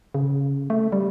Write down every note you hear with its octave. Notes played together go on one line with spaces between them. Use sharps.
C#3
A3
G3